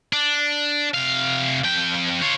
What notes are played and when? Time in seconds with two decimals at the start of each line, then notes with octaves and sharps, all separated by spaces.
0.13 D4
0.94 C3 F5
1.65 F2 G5
2.21 F4 C#5